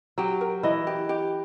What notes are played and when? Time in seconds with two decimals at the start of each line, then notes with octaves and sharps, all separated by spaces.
0.18 F#3 G4
0.41 A#4
0.63 E3 D#5
0.87 G4
1.09 G4